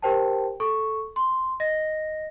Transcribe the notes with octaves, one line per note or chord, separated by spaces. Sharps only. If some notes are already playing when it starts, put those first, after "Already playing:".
G4 A#4 C5 G5 A5
A4 C#6
C6
D#5 A#6